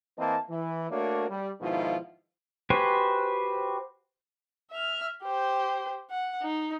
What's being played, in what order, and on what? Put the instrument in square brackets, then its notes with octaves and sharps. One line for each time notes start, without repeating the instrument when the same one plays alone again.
[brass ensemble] E3 A#3 C4 D#5 A5
E3
A3 A#3 D4 F#4 A#4 C#5
G3
G#2 B2 D#3 F3 E4 F4
[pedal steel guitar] F#4 G4 B4 C5 G#5
[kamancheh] E5 F6
G4 C5
F#5
D#4